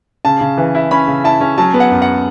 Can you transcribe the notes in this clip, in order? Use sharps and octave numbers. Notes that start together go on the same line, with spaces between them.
C#3 A5
C#3
E3
E4
C#4 B5
C#3
E4 A5
C#4
F#3 A5
B3
F#5
F#2
F#5